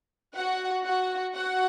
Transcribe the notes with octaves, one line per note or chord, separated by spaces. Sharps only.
F#4 F#5
F#4 F#5
F#4 F#5